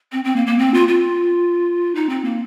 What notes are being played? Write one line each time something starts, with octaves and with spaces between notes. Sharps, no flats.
C4
C4
A#3
A#3
C4
F4
F4
D#4
C4
A#3